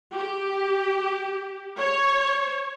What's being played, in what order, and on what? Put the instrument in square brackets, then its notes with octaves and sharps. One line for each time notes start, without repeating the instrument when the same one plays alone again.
[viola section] G4
C#5